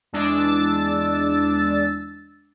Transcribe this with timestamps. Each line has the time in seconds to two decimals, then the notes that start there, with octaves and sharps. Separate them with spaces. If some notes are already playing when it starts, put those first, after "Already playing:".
0.13 E2 G#3 D4 E6 A6